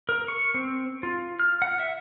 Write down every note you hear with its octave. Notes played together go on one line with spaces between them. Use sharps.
A#4
C#6
C4
F4
F6
F#5
E5